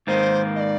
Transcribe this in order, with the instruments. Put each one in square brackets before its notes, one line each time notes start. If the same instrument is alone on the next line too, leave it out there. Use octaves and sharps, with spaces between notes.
[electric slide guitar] G#2 D#3 A#3 [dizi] C5
[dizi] D#5
D5